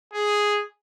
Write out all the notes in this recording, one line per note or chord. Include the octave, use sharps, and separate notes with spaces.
G#4